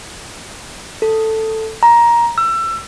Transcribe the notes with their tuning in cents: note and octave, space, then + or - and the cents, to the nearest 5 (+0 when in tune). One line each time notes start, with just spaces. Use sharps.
A4 +5
A#5 +15
E6 +30